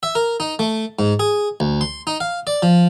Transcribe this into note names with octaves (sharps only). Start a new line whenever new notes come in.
E5
A#4
D#4
A3
G#2
G#4
D2
C6
D#4
F5
D5
F3